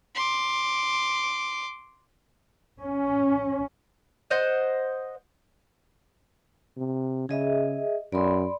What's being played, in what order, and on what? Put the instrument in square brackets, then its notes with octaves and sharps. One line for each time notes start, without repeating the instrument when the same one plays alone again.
[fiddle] C6 D6
[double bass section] C#4
[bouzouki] C5 D#5 F#5
[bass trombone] C3
[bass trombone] C#3 [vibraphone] G#4 D#5 E5
[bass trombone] F#2 [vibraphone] D5 B5 C6